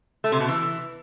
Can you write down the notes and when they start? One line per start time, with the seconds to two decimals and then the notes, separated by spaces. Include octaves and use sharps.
0.24 A3
0.32 C3
0.40 B2
0.48 E3